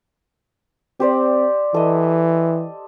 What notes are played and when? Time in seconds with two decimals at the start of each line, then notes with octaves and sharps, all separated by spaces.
1.00 C4 G4 C5 D5
1.74 E3 A4 D#5